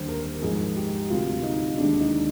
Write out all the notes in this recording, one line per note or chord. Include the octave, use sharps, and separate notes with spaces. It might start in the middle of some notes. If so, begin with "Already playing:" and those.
Already playing: D#2 D3 G3 C5
A#4
G#1 G#2 F3 G#4
G4
D2 C3 G3 F4
D#4
D#2 D3 G#3 D4
D#4